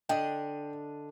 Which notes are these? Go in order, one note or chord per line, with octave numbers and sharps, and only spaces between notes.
D3 D4 D#5 G5